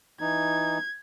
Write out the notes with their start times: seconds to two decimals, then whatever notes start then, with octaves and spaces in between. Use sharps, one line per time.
0.21 E3 D#4 G#6